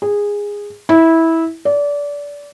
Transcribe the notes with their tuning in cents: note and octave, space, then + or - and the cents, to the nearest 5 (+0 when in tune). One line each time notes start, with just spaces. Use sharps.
G#4 -15
E4 -15
D5 -25